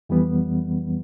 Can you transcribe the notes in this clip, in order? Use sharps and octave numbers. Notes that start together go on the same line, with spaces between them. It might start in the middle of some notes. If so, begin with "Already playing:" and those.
F2 E3 G3 B3